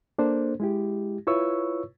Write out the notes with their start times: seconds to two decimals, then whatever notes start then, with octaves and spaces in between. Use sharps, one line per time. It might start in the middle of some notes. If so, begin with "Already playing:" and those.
0.18 A#3 D4 A4 C5
0.60 G#3 E4 G4
1.27 E4 F4 B4 C#5 C#6 E6